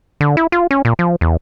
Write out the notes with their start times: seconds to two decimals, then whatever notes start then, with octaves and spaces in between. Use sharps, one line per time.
0.21 D3
0.37 E4
0.52 F4
0.71 C#4
0.85 A#2
0.99 F3
1.21 E2